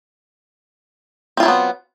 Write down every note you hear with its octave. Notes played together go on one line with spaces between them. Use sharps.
F#3 B3 C4 E4 F4